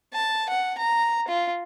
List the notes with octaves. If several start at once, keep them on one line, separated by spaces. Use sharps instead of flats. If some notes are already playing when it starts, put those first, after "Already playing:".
A5
F#5
A#5
F4